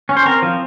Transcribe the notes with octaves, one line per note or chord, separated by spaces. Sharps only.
C#4
C5
C4 A#4
F3